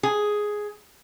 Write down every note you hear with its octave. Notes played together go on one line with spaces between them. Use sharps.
G#4